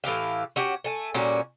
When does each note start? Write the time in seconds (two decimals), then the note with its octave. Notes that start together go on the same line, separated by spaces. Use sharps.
0.04 A2 E3 G4 F5
0.56 C#4 F#4 G4
0.84 A3 G#5
1.14 A#2 G3 C#4 F#4